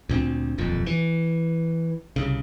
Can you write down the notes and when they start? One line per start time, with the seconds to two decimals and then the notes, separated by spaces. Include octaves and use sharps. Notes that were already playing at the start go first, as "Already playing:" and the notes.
0.09 D2 A#2 A#3 C4
0.58 D#1 B1 F2 A#2
0.86 E3
2.16 C2 C#3